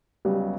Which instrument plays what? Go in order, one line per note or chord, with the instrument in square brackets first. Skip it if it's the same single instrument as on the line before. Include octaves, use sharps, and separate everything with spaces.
[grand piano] C#2 C#3 F#3 B3 [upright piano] G3